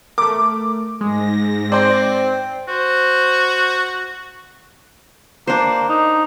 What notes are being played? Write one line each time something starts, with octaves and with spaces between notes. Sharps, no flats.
A3 A#4 D6
G#2 G#3 A#6
C4 C5 D5 C6
F#4 C5
A#3 D4 C5
D#4